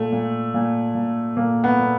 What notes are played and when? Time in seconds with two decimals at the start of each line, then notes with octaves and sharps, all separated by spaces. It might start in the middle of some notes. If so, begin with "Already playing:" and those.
Already playing: A#2 A3
0.12 A#2
0.54 A#2
0.95 A#2
1.36 A#2 A#3
1.64 B3
1.79 A#2